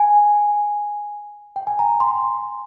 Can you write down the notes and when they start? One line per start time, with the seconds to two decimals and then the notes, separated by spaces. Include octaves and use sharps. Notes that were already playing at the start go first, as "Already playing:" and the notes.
Already playing: G#5
1.56 G5
1.67 G#5
1.79 A#5
2.00 C6